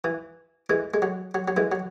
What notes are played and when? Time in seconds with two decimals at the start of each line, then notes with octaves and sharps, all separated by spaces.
0.04 E3
0.70 E3 G#3
0.94 G#3
1.02 F#3
1.35 F#3
1.48 F#3
1.57 E3 G#3
1.72 F#3